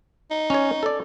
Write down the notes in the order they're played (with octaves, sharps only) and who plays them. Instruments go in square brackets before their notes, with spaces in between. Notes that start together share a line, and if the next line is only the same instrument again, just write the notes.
[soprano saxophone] D#4
[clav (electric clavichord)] C#4 C#5
A4 D5